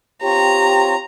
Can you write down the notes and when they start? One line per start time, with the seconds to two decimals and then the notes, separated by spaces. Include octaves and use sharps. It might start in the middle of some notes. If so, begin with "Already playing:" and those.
0.23 C4 F4 G4 C#5 A#5